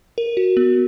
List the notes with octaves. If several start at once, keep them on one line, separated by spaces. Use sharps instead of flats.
A#4
F#4
B3